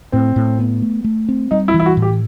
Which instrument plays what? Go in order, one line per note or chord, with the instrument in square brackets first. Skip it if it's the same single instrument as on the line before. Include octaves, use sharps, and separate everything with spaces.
[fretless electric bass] A2 [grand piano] C4
[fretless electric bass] A2
B3
A3
A3
C4
[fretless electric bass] G3 [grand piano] D#4
[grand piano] E4
[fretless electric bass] E3
[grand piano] E4
F#4
[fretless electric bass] A2
[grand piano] G4